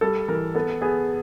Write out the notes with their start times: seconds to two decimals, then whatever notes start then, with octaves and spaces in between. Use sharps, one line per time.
0.01 G3 A4
0.28 E3 A#4
0.55 B3 A4
0.82 B3 G#4